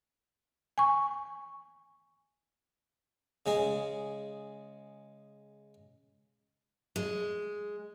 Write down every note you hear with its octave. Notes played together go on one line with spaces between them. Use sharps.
G#5 C#6
C#3 G#3 G#4
G#3